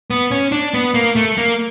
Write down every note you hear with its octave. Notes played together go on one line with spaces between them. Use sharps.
B3
C#4
D4
B3
A#3
A3
A#3